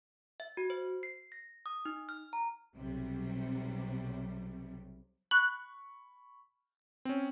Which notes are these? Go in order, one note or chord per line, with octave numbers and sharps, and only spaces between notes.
E5
F#4
C5
C7
A#6
D#6
D#4
F6
A#5
B1 C3 F#3 G3
B5 C#6 F#6
C4 C#4